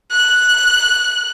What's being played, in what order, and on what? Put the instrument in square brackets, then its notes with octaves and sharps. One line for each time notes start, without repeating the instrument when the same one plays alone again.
[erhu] F#6